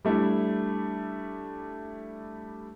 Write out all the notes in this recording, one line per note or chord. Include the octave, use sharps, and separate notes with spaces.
G3 A3 D4 E4